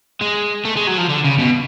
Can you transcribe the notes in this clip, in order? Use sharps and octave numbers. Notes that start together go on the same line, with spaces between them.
G#3
A3
G#3
F#3
F3
D3
C#3
B2